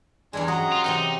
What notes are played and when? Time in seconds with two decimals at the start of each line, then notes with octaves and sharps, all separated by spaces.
0.33 E2 G2 G#3 D4 G#5
0.48 F#3 C#4 D#5 F#5 A#5 D#6
0.72 F4
0.84 C3 E3 C4 D#4